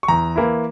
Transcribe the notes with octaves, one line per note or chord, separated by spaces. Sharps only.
C#6
E2 A#5
E3 A#3 E4